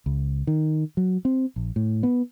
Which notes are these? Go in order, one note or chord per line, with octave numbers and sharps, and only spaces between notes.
C#2
D#3
F#3
C4
A#1
A2
B3